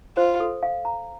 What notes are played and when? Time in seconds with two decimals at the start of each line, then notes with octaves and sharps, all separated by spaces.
0.17 F4 C5
0.40 A4
0.63 F5
0.85 A#5